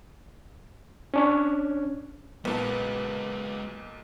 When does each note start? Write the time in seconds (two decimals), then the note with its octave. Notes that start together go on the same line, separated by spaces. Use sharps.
1.14 C#4 D4 C#5
2.45 B1 A#2 G#3 B3 F4 A5